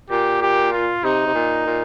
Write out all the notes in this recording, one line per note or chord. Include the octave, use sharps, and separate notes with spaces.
A#2 G4
G4
F4
C3 D#4
C3
A#2
A#2